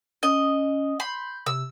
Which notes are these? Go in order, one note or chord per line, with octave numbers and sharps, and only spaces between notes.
C#4 D#5
B5 C6 G6
C3 E6